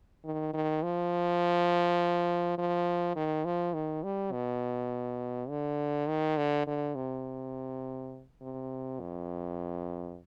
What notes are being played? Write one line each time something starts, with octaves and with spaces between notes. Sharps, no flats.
D#3
D#3
F3
F3
D#3
F3
D#3
G3
B2
D3
D#3
D3
D3
C3
C3
F2